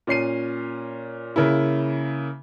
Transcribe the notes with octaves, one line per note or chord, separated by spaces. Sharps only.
A#2 C#4 C7 D#7
C#3 A#3 E4